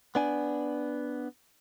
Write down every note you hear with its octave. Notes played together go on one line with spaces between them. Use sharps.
B3 D4 G#5